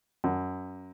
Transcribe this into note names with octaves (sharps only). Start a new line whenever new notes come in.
F#2